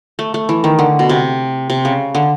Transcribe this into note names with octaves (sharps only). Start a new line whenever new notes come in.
A3
A3
E3
D#3
D3
B2
C3
C3
C#3
D3